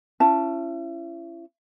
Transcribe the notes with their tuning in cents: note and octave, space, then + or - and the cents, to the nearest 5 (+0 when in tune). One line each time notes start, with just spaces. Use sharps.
C#4 +0 E4 +35 A5 +0